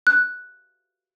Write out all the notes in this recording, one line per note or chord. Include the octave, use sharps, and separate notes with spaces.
F#6